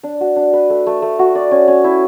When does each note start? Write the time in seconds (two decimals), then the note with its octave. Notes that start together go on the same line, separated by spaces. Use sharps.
0.03 D4
0.21 F#4
0.36 D4
0.53 B4
0.70 A3
0.87 A3
1.02 A3
1.19 F#4
1.35 D5
1.51 C#4
1.68 C#4
1.84 E4